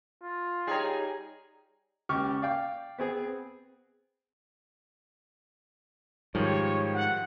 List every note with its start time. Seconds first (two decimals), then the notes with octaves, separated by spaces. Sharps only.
0.23 F4
0.67 G3 D#4 G#4 C#5 G5 A#5
2.09 C#2 G4 C#6 D6 F6
2.42 D5 F5 G5
2.98 B3 C4 G#4
6.35 G#2 D#3 F3 G3 C#5
6.94 F#5